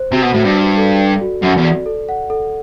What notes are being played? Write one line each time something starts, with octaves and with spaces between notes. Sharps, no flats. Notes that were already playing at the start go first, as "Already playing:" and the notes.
Already playing: C5
C3 F#4
B2
A2 F#4
G2
D5
A4
D5
F#4
F#2 F#4
E2
D5
A4
F#5
A4